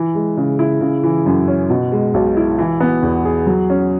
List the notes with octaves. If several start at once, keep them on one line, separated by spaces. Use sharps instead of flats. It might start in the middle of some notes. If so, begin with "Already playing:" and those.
Already playing: E3
G#3
C#3
E4
C#3
E3
F#2
C#4
B2
G#3
B1
E4
E3
B3
E2
G#4
F#3
C#4